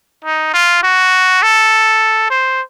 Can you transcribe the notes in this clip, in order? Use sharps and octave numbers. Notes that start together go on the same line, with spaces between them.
D#4
F4
F#4
A4
C5